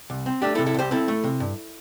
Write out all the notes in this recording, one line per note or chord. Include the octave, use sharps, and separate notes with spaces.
C2
C4
A3 D4 G4
E4 A4
C3
E4 A4
C2 G4 C5
C4 E4 A4
A3
C3
G2